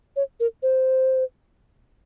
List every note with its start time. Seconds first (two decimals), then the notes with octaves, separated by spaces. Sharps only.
0.16 C#5
0.40 A#4
0.63 C5